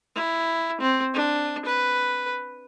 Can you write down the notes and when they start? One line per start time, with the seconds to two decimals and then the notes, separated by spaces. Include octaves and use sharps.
0.16 E4
0.81 C4
1.14 D4
1.65 B4